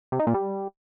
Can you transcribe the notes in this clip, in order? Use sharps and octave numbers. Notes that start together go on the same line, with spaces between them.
C3
D#4
A#2
G3